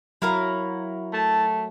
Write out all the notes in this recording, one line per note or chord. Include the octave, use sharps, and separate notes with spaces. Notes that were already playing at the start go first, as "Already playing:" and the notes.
F#3 E4 F#4 A#4 F5 A#5
A3 A5